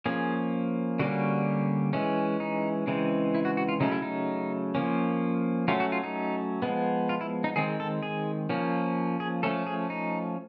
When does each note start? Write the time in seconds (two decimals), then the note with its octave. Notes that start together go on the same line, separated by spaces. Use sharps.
0.06 F3 A#3 C#4 G#4
0.99 D3 G3 A#3 C#4 F#4
1.93 E3 G#3 C#4
2.40 D#4
2.87 C#3 E3 G#3 C4
3.34 E4
3.45 F#4
3.57 F#4
3.68 F4
3.80 C#3 F#3 A3 C#4 D#4
3.92 E4
4.02 D#4
4.75 F3 A#3 C#4
5.68 F#3 A3 C#4 F4
5.80 F#4
5.92 F4
6.04 D#4
6.62 F3 G#3 B3
7.09 F4
7.21 E4
7.44 D#4
7.56 D#3 G#3 C4 G#4
7.80 A4
8.03 G#4
8.49 F3 A#3 C#4
9.20 G#4
9.43 F3 A3 C#4 A4
9.67 G#4
9.90 D#4